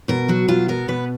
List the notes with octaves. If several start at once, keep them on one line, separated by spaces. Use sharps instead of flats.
B2 A#4
F#3 F#4
B2 F4
B3 A#4
B2 B4